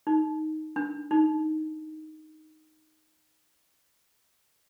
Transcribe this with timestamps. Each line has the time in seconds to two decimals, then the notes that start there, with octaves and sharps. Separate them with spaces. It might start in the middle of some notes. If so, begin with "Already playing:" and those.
0.07 D#4
0.76 D4
1.11 D#4